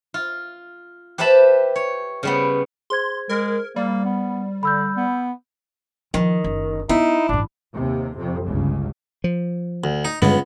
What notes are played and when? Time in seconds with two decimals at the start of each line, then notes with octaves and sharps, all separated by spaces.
0.14 F4
1.18 G4 B4 C5 E5 A5 B5
1.76 C#5
2.23 C#3 G3 B3
2.90 G#4 C5 C6 G#6
3.29 G#3 A#4
3.76 G3 A#3
4.05 B3
4.63 D3 B5 E6 G6
4.97 B3
6.14 D#3 F3
6.44 F#1
6.89 B3 D#4 E4
7.29 A1 G2 D4
7.73 D#2 C3
8.16 F2 C3
8.46 G1 C#2 C#3
9.24 F3
9.84 D2
10.05 D#4
10.22 C#2 G2 D3 G#3 B3